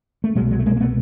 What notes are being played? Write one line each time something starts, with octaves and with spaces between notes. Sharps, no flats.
A3
C2 B2 F#3 G#3
F#3 G#3
A3
G#3 A#3
A#3
A3 B3